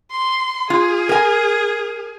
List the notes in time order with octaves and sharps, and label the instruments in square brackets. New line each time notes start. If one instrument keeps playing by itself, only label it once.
[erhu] C6
[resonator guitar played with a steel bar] F4 [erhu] G#4
[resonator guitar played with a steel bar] A#4 G#5